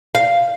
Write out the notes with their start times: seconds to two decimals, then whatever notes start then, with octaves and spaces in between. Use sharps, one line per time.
0.15 F5